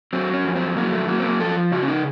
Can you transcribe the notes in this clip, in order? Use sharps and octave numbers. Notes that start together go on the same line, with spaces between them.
F#3 C4
C#4
F2
C4
F#3 A#3
A3
F#3 A#3
C4
A#3
F3 A4
C#3 F#4
C#4
D#4